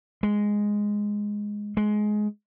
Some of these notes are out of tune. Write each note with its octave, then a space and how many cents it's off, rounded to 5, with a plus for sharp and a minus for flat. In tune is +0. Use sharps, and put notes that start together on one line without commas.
G#3 -5
G#3 +15